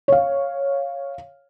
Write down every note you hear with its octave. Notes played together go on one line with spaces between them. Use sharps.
C#5 F5